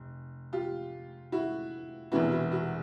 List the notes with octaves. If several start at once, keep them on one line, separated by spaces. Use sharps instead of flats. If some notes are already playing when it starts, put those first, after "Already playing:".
Already playing: F1
F4 G4
E4 F#4
E1 E2 C3 E3 E4 F#4
E4 F#4
E4 F#4